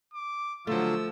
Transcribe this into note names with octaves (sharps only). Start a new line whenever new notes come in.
D6
D3 F3 F#3 A3 F4 E6